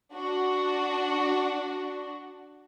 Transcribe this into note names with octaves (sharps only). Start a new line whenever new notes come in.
D4 F#4